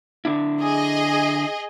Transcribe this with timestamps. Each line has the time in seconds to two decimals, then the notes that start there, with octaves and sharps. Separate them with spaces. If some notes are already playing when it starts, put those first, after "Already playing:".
0.25 D3 D4 E4
0.61 G#4 D#5